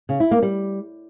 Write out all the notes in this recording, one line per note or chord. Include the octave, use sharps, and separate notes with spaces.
C#3
E4
A#3
G3